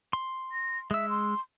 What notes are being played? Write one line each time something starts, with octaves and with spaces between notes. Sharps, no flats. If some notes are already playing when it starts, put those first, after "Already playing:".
C6
A#6
G#3 E5 E6
C6